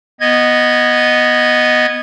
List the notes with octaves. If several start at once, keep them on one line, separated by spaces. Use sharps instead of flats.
B3 D#5 G#6